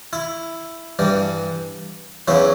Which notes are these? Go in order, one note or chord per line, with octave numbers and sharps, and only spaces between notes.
E4
G2 E3 G3
E2 C#3 F#3 E4